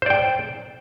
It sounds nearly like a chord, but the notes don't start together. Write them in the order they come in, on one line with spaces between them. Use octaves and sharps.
C5 D5 G5